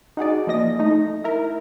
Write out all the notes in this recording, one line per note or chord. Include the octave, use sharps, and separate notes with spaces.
D#4 F#4 G#4 D5
F3 A#3 D#5 A#6
A3 D#4
E4 A#4